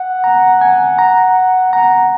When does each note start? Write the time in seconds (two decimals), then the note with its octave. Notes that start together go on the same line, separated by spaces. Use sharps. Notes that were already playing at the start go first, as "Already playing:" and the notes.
Already playing: F#5
0.24 A#5
0.61 G#5
0.99 A#5
1.73 F#5 A#5